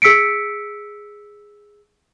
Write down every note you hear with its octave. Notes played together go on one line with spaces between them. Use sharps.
G#4 E6 B6 C#7 D7